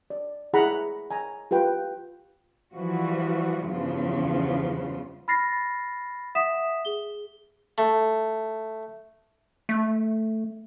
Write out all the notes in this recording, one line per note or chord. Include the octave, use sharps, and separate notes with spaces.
D5
E4 G#4 F#5 A#5 B5
G#5 A#5
F4 G4 B4 G5
E3 F3 G3 F#4
E2 G2 C#3 F3
B5 F6 A6 A#6 C7
E5 F#5 D#6 B6 E7
G#4 G7
A3
A3